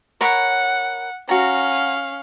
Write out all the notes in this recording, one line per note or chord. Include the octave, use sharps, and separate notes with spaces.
A#4 C#5 F#5 B5
C#4 F#4 F5 A#5